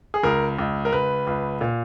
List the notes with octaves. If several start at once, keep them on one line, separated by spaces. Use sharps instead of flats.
G#4
C#2 A#4
C#2
A#4
C#2 B4
C#2
A#2